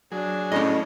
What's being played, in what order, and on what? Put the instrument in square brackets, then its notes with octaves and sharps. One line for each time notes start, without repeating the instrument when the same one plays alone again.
[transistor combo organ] F#3 G#4 [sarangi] D4
[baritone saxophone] A2 [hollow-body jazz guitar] C#4 D#5